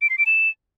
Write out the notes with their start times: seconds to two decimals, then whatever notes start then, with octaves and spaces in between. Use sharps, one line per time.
0.02 D7
0.10 C7
0.18 D7
0.26 E7